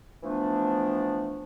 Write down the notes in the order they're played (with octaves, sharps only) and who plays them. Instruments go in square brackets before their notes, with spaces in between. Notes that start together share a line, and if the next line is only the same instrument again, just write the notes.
[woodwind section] E3 F3 A3 B3 D4